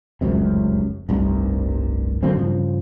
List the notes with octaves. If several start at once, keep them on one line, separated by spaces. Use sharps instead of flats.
F1 C#2 F#2 C3
F1 C2 G2
D3 F#3 A#3 C4
G2 C#3 F3